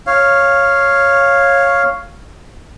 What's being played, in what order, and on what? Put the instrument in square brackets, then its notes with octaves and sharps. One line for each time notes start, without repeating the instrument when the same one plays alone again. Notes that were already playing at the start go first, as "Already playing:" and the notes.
[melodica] C#5 F5